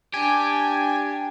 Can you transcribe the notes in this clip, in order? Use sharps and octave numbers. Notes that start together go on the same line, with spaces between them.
D4 G4 G#5